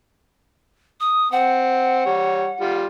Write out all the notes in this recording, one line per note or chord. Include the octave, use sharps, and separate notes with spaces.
D#6
C4 F#5
G3 C#5
G3 F4